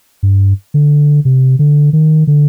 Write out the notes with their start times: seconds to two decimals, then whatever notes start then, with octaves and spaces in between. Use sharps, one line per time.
0.23 G2
0.74 D3
1.25 C3
1.59 D3
1.93 D#3
2.27 D3